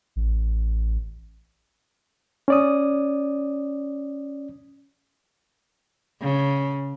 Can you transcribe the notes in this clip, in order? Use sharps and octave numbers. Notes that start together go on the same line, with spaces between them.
A1
C#4 D5 D#6
C#3